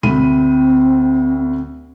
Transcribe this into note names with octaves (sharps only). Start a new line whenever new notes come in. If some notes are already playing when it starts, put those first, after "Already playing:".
D2 C4 B5 D#7